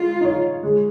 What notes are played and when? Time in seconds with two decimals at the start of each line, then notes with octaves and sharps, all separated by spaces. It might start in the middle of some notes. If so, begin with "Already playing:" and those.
Already playing: G#3 F4
0.21 D#4 C#5
0.63 G#3